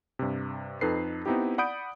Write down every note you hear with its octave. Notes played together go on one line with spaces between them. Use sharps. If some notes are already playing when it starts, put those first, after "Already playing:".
G2 C3
F2 D#4 A4 B4 C7
B3 C4 D#4 E4 G4
D5 F#5 B5 D#6 G6 D7